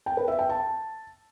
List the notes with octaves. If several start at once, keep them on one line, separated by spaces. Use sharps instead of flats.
G5
B4
E5
G5
A5